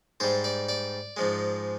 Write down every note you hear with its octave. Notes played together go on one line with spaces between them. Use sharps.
G#2 G3 C5
D5
D5
G#2 F3 G#3